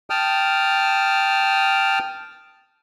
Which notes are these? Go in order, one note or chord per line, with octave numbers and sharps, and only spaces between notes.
G5 A5 D#6 F6